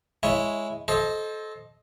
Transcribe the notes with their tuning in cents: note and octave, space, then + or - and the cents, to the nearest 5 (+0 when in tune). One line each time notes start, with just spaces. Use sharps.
G#3 +0 E4 +0 C#5 -5
A4 -25 C5 +10 D#5 +0